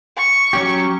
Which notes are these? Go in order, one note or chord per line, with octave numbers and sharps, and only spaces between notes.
C#6
F#3 C#4 G4